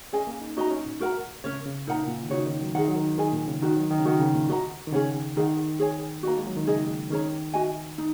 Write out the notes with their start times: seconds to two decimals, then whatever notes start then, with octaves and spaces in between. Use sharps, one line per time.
0.13 C#4 G#4 D#5 G#5
0.27 A#3
0.41 D#4
0.57 D#4 F#4 D#5 A#5
0.70 C#4
0.86 A#2
1.00 F#4 A#4 F#5 A#5
1.44 C#3 C#4 A#4 C#5
1.66 C#3
1.87 A#2 D#4 A#4 F#5 A#5
1.98 C#3
2.08 A#2
2.23 D#3
2.30 C#3 D#4 F#4 C#5
2.46 D#3
2.60 F#3
2.75 D#3 G#4 D#5 F#5
2.88 F#3
2.96 D#3
3.18 D#3 G#4 D#5 G#5
3.32 A#2
3.48 C#3
3.62 D#3 D#4 F#4 D#5
3.76 F#3
3.91 D#3
3.99 C#3
4.05 D#3 F#4 A#4 F#5
4.20 C#3
4.34 A#2
4.49 F#4 D#5 F#5 A#5
4.87 D#3
4.92 C#3 C#4 G#4 C#5 F#5
5.37 D#3 G#4 D#5 F#5
5.79 G#4 C#5 G#5
6.23 A#3 F#4 D#5 A#5
6.38 G#3
6.47 F#3
6.57 D#3
6.67 C#3 D#4 G#4 D#5
7.10 D#3 C#4 G#4 C#5 A#5
7.54 F#4 D#5 G#5
7.98 D#4